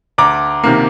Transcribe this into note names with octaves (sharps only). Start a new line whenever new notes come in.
D2 A#5 D6
C3 D#3 A#3